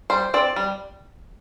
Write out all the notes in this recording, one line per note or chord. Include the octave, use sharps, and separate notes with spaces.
G3 C5
C4 D5
G3